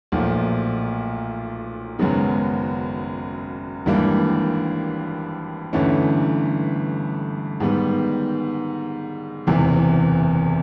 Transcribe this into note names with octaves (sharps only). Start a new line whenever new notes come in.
B1 A#2 F3 A3
G#1 F#2 C#3 F#3 B3
G#1 G2 E3 G3 A#3
G1 G2 E3 A3 C#4
G#2 D#3 G3 B3
F#1 E2 C3 E3